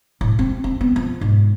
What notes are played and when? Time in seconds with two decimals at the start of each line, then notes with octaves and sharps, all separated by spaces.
0.21 A2
0.39 C4
0.64 C4
0.81 B3
0.96 F3
1.21 G#2